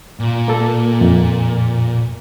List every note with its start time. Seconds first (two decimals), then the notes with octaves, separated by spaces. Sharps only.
0.20 A#2
0.48 A#3 A4
1.01 F2